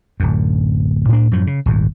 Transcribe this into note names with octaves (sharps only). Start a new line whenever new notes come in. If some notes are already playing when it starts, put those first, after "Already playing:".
D1 F#2
A2 D4
F#2 A2 F3
C#3
D#1 G#1 D#2